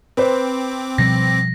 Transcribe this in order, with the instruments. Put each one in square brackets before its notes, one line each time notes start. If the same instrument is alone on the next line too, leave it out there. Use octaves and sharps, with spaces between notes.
[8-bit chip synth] C4 D6 [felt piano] B4 C5
[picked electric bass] B2 F3 G3 [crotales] A#6